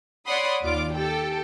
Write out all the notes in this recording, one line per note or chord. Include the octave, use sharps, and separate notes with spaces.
C#5 D5 F#5 B5 C6 D#6
D#2 F4 D5 D6
G4 A4 G5